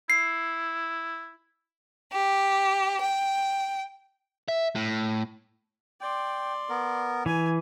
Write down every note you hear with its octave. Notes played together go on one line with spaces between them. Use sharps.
E4 C7
G4
G5
E5
A2
D5 G5 C6
B3 A#4
E3 G#5